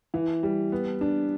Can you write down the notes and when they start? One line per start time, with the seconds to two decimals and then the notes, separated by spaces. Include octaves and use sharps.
0.14 E3
0.43 G3
0.72 B3
1.01 D4